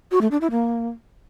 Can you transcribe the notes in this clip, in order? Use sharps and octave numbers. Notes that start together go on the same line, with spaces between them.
F#4
A3
D4
E4
A#3